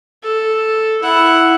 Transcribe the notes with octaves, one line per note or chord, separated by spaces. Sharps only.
A4
E4 F#5